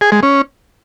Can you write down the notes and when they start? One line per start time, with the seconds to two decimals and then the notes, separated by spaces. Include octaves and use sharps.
0.01 G#4
0.12 G#3
0.23 C#4